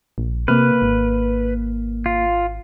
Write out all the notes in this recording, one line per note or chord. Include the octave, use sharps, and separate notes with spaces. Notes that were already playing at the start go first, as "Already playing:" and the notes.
A#1
C3 A#3 B4 F6
G#1
F4